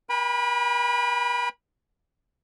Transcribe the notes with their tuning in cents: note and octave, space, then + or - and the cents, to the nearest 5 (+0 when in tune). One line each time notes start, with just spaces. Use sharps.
A#4 +45 G5 +45 B5 -15